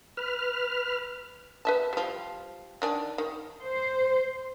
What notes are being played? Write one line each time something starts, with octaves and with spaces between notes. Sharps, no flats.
B4 F6
B4 E5 A5
F3 G3
D#3 D4 G#5
D#3
C5